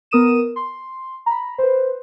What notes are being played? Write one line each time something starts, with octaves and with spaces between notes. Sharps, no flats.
B3 A#4 D#6 D#7 E7
C6
A#5 B5
B4 C5